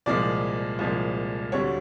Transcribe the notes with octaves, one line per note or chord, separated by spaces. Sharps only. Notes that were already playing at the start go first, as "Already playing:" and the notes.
C2 A#2 F3 G#3 D5
C2 A#2 F3 G#3
D2 D3 G3 C#5